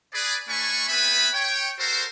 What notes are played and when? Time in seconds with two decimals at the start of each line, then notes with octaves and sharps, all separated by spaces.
0.14 G#4 B4 D5
0.49 A3 D4 C#5 G#5 B5 C#6
0.89 B3 C4 B4 E5 G#5 B5
1.34 C#5 G5
1.79 F#4 A4 A#4 C5